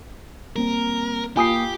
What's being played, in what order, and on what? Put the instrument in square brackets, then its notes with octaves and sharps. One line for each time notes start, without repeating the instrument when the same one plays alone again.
[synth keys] G3 A#3 C4 [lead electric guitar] A#4
[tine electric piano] A#3 D#6 C7 [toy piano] F4 G#5 [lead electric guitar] G4 [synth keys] F5